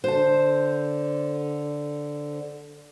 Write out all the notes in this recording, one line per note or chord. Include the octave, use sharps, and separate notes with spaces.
D3 C5 A5